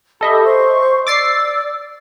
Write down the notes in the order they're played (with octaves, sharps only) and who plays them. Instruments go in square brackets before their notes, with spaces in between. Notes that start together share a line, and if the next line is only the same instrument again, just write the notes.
[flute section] G4 B5 [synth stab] A4 D#5 E5
[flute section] C5 C#6
[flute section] D5 E6 [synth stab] D6 A6 C7